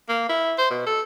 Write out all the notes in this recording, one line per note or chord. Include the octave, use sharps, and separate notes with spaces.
A#3
E4
C5
B2
A4